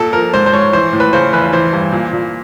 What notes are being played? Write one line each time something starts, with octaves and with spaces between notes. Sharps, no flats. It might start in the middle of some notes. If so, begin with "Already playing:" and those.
Already playing: A#2 A4
F3 A#4
G#2 C5
C5
G#2 C#5
E3 C5
A2
B4
C#3 C5
E2 B4
E3 C5
G2
A#2
A#2